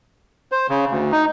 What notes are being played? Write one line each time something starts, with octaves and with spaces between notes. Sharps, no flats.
C5
C#3
D2
D#4